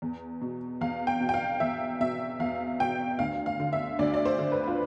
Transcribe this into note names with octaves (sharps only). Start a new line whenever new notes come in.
E2
B2
E2 F5
G5
B2
G5
F5
E2 E5
B2 E5
E2 F5
B2 G5
D2 F5
F5
D3
E5
D2 D5
D5
C5
D3
B4
F4